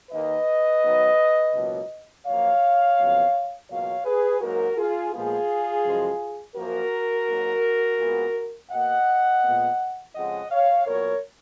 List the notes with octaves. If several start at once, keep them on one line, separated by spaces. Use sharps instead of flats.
D#2 D#3 A#3 B4 D#5
G#2 D#3 F#3 B3
C#2 B2 F#3 A#3
F#2 F3 A#3 C#5 F5
F2 C#3 F#3 B3
C#2 B2 F#3 A#3 C#5 F5
G#4 B4
G#2 F#3 A#3 F#4 A#4
F4 G#4
A#2 F3 G#3 B3 F4 G#4
F#2 C#3 F3 G#3
F#2 F3 A#3 F#4 A#4
G#2 F#3 A#3
A#2 G#3 B3
B2 A#3 D#5 F#5
A#2 G#3 B3
F2 C#3 G#3 D#5 F#5
C#5 F5
A#2 F#3 B3 A#4 C#5